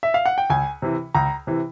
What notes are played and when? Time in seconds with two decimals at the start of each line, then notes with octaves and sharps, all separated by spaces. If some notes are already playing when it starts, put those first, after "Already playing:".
0.03 E5
0.14 F5
0.26 F#5
0.38 G5
0.50 C#2 G#5
0.82 C3 E3
1.15 C#2 A#5
1.47 C3 E3